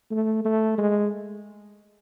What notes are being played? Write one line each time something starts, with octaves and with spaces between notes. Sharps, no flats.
A3
A3
G#3